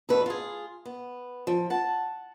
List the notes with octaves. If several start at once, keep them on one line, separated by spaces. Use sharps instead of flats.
E2 B2 A3 F#4 B4
F4 G#4
B3
F3
F#5 A5